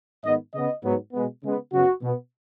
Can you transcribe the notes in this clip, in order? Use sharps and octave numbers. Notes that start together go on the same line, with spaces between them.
G#2 D#3 B3 D#5
C#3 B3 D#5
G#2 F#3 B3
B2 G#3 B3
C#3 G#3 B3
F#2 C#3 F#3 B3 F#4
B2 B3